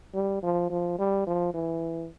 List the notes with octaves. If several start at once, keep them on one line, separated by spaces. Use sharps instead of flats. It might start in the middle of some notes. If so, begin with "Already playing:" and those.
G3
F3
F3
G3
F3
E3